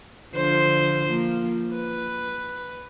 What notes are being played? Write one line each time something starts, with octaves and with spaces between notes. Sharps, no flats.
D3 F3 C5
F3 A#3
B4